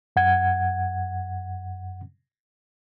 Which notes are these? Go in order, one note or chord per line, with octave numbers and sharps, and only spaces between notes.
F#2 F#5 G#6